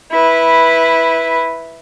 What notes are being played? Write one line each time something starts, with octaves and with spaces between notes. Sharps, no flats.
E4 B4